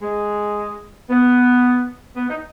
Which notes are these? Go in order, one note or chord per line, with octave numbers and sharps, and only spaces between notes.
G#3
B3
B3
D#4